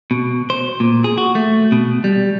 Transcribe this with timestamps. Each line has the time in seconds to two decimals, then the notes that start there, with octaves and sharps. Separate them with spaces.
0.11 B2
0.50 C5
0.80 A#2
1.04 G#4
1.18 F#4
1.35 A3
1.72 B2
2.04 G3